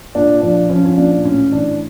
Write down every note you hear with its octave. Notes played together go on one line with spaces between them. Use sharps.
A#2 D4
F3 D4
F3 C#4
C#4
A#2 D4
A2 C#4
E3 D4